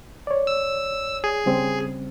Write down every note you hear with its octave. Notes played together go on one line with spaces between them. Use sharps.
C#5 D5
E6
G#4
C#3 G3 C4